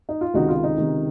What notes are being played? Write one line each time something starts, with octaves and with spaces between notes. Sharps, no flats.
D#4
F4
C#2 C3 D#3 D#4 F#4
F4
D#4
C#2 C3 D#3